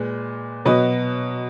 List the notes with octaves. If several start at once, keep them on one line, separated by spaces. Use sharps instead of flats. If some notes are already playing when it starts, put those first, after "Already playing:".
Already playing: A#2 G#3 B4
B2 F#3 B4 D#5